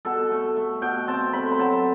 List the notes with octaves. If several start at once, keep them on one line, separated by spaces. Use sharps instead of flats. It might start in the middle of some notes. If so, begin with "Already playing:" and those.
B2 A4
A3
A3
B2 G5
C4 A5
A3 B5
C6
B5
F#3 A5